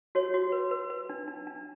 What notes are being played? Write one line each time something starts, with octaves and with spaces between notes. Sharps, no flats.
F#4 C#5
F#4
B4
B4
B4
D4
D4
D4